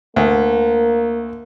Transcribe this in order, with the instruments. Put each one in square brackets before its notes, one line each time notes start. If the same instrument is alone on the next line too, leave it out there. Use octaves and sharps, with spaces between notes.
[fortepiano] D2 [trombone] A#3